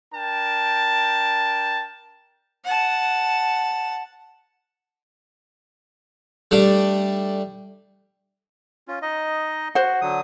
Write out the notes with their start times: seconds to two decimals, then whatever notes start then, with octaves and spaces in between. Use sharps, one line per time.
0.14 D4 A#4 G5 A5
2.64 F#5 A5
6.51 G3 A3 D4
8.88 C#4 F4
9.02 D#4 D#5
9.75 F#4 C5 F#5
10.02 D3 F#3 D#6